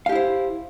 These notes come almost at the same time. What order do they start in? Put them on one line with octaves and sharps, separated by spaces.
F5 G4 E4 C5